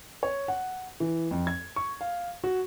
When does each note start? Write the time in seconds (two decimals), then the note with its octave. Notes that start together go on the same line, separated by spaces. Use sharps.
0.23 C#5
0.48 F#5
1.00 E3
1.31 F2
1.47 G#6
1.76 C#6
2.01 F5
2.44 F#4